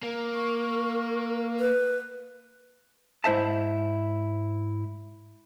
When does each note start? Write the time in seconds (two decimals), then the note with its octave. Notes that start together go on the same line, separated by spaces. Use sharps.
0.03 A#3 A#4
0.34 C#6
1.59 B4
3.24 G#2 E4 C5 E5 A5